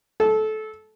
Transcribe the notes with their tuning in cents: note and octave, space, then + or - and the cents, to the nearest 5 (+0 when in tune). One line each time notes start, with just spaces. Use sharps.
A4 -20